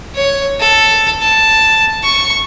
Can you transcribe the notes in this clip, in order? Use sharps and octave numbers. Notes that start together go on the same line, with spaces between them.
C#5
A4
A5
C#6